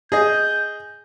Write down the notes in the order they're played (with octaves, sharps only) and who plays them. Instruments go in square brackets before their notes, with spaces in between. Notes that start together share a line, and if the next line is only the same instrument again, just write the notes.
[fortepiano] G#4 D#5 [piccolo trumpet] G6